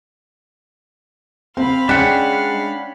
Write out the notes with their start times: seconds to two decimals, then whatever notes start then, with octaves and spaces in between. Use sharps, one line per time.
1.57 C4 F5 B5
1.89 G#3 C#4 D4 F#5 G5 B6